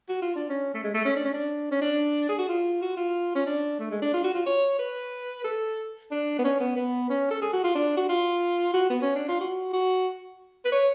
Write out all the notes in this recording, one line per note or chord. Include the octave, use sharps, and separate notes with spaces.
F#4
F4
D4
C#4
A3
G#3
A3
C#4
D4
C#4
D4
C#4
D4
G#4
F#4
F4
F#4
F4
C#4
D4
A3
G#3
D4
F4
F#4
F4
C#5
B4
A4
D4
B3
C#4
B3
B3
C#4
A4
G#4
F#4
F4
D4
F#4
F4
F#4
B3
C#4
D4
F4
F#4
F#4
B4
C#5